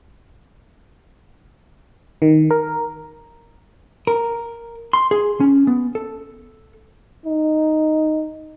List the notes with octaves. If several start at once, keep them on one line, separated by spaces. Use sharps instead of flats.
D#3
A#4
A#4
C6
G#4
C#4
B3
A4
D#4